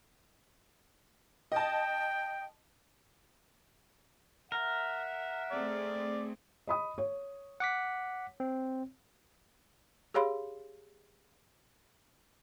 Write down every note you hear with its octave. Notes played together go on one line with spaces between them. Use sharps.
D#5 G5 A5
A#4 E5 F#5
A3 C4 G#4 D5
D#5 B5 D#6
C#5
F#5 D6 B6
C4
G4 G#4 C#5 F5 B5 C6